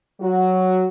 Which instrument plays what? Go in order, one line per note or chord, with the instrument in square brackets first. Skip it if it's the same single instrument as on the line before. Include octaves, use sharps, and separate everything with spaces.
[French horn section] F#3 F#4